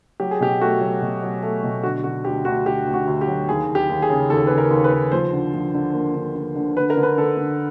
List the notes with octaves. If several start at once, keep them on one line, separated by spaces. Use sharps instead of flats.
F#3 G4
G#4
B2 G4
A3 F#4
F#3
B2
F#3
A3
B2
D3 F#4
D3 F#4
D2 G4
D2 F#4
D2 G4
D2
F#4
D2
G4
F#3
D#2 G#4
D#2
G4
D#2
G#4
C#3
D#2 A4
C#3 B4
A#4
D#2
B4
D#2
F3 C5
D3
F3
D3
A#3
D3
D3
D3
D3 B4
A#4
D3
B4
D3 A4
D3